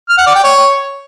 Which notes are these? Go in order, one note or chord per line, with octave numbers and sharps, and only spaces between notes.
F6
F#5
D5
G5
C#5